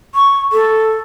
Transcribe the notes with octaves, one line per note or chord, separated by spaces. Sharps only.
C#6
A4